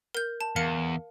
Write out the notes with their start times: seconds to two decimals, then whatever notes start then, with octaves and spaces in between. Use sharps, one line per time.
0.15 A#4 G6
0.41 A5
0.56 E2 A#4 F5 C#7